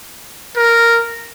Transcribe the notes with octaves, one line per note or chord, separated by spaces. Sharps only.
A#4